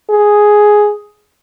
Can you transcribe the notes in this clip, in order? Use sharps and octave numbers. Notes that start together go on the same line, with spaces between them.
G#4